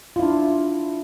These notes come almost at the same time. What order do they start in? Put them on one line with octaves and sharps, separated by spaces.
F4 E4 D4